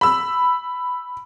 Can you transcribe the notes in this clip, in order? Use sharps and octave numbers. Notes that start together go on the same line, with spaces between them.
B5 E6